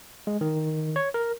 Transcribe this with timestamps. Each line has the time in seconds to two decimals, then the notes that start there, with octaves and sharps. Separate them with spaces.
0.27 G#3
0.41 D#3
0.96 C#5
1.14 A#4